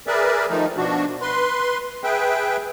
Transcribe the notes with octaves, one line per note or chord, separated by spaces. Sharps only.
G#4 A#4 B4 D5 E5
D#3 F3 A3 D#4
B2 F3 D4 F#4
B4 C6
G#4 B4 E5 G5